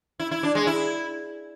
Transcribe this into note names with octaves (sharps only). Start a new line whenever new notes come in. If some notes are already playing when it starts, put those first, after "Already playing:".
E4
E4
D4
G#3
E4